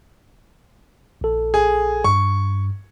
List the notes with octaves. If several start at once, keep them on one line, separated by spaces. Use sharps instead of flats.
A#1 A4
G#4
G2 C#6